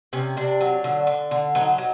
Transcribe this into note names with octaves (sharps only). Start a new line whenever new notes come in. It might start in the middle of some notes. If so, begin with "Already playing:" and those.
C3 C#4
C3 D4
F#3
D3
D3
D3
F#3 D#4
F#3